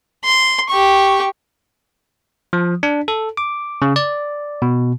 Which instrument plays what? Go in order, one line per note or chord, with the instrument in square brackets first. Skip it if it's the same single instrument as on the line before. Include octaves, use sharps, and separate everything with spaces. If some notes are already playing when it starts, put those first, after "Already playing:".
[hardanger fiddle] C6
G4 C#6
[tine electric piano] F3
D4
A4
D6
C#3
D5
B2